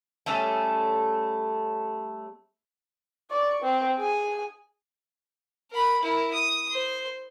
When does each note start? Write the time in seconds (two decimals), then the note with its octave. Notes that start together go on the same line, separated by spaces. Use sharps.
0.26 G3 A3 C#4 A4
3.31 D5 C#6
3.63 C4
3.97 G#4 G#5
5.71 A#4 B5
6.01 E4 A#4
6.33 D#6
6.71 C5